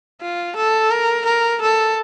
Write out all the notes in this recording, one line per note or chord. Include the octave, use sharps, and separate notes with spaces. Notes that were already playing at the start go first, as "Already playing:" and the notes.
F4
A4
A#4
A#4
A4